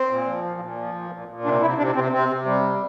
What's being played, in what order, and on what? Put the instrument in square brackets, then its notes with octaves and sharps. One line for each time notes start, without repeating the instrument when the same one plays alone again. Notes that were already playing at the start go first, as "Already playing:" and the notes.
Already playing: [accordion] C4
A#2
F3
A#2
A#2
F3
A#2
A#2
A#2
C3 D4
C3 E4
C3 D4
C3 C4
C3 C4
C3
G3
C3